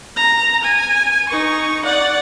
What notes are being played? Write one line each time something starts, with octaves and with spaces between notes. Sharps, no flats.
A#5
G#5
D#4 C#6
D5 F#5